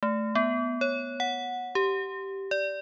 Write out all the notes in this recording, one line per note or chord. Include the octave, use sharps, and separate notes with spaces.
A3
B3
C#5
F#5
G4
D5